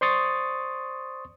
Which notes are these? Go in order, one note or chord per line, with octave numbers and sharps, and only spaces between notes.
C5 D5 C6 C#6 D#6 A6